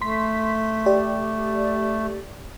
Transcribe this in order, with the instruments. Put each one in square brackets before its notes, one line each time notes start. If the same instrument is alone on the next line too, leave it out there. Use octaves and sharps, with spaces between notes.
[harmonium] A3 [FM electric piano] C6 B6
[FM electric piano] G4 D5